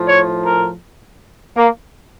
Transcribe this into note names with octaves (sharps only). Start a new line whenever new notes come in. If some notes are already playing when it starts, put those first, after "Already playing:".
Already playing: A2 F3
C#5
A#4
A#3